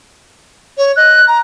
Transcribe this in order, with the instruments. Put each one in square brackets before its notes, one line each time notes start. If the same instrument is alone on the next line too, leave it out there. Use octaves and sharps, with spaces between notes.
[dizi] C#5
[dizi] D#5 [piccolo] F#6
[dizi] A#5